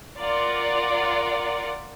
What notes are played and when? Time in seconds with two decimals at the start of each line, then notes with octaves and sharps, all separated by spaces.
0.21 F4 A#4 D5 F#5